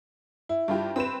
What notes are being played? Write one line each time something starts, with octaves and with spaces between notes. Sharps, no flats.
E4
G2 F4 G4
C4 B4 E7